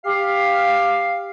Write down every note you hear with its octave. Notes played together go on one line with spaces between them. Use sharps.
G4 F5